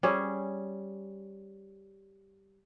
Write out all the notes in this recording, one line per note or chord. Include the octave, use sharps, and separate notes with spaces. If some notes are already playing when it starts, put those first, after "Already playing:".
G3 C#4 G#4